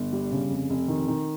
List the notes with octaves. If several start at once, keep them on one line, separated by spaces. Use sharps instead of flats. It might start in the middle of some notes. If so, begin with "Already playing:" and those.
Already playing: G1
G3
C#3
F1
F1
D#3
D#3